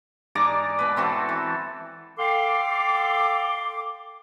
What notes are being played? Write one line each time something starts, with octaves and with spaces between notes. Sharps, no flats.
G#2 D5 A#5 D6
B2 B4
E3 C4 F#4 A4
E3
A4 F5 G5 C6 D6